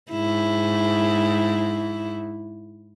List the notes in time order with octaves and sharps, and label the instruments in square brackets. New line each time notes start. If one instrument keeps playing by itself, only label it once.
[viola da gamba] G#2 E4